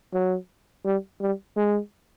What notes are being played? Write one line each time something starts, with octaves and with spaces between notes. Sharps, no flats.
F#3
G3
G3
G#3